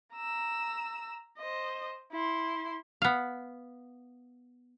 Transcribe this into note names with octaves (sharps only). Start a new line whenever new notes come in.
A#5 E6
C5 D#5
E4 C6
B3 F5